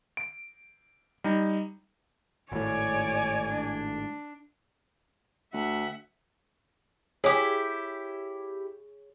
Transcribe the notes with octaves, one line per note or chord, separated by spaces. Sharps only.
D7
G3 D#4
G#1 A2 C#5 D5 G#5
D4
D2 E5 F#5
E4 G4 G#4 C#5